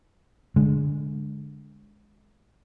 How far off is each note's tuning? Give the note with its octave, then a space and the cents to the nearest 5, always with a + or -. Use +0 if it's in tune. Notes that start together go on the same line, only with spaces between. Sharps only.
D3 -20 G#3 +0